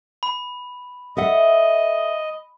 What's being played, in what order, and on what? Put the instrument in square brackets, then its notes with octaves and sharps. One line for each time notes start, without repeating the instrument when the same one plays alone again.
[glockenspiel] B5
[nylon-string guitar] A4 E5 F#5 [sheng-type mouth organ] D#5